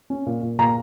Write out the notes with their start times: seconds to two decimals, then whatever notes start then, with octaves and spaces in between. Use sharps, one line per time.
0.10 C#4
0.26 A#2
0.43 A#2
0.59 A#2 A#5